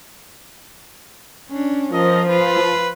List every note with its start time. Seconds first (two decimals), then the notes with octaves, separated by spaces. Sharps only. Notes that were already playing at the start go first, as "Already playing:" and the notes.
1.49 C#4 D4
1.93 F3 A#4 D#5
2.30 F4 B4